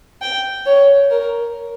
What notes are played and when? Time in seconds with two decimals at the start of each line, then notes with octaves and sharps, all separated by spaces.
0.22 G5
0.66 C#5
1.10 A#4